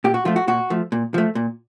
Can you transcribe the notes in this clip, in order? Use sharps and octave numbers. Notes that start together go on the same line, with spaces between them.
A#2 G4
F#4
F3 A3 F4
F#4
A#2 F#4
F3 A3
A#2
F3 A3
A#2